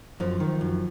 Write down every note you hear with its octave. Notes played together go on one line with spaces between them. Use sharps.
F#2 F3
D#3
F#2